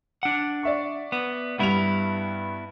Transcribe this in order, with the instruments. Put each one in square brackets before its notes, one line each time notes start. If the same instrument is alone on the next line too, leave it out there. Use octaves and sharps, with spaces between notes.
[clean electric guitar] D4 F#5
[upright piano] D5 E5 C#6
[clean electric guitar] B3
[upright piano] G2 G3 F7 [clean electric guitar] B3 E4